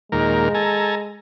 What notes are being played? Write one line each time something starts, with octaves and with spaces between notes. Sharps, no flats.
D#2 A#2 G#3 A#4
A4 G#5 A#5